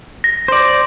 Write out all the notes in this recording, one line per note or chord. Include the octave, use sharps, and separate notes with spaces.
A#6
C5 D5